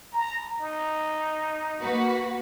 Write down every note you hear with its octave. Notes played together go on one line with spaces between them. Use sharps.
A#5
D#4
A#3 F#4 B4